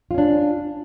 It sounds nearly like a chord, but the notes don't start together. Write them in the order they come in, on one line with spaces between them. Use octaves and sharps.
F4 C#4 D4